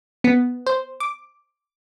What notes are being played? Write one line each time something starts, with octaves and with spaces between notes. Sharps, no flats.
B3
C5
D6